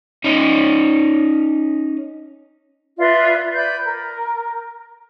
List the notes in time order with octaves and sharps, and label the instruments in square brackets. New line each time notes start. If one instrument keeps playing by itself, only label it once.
[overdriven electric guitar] C#4 D#4
[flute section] F4 B4 D5 E5
B4 D5 B5 G6
A#4